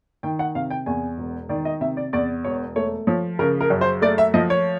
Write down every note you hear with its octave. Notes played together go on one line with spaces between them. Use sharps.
D#3 G5
F#5
C3 F5
G5
E2 G#5
E1
D#3 D5
D#5
C3 E5
D5
E2 D5
E1 C#5
A3 C#5
F3 C#5
C#3 A#4
A#4
F#2
C5
A3 D5
E5
F3 D#5
C#5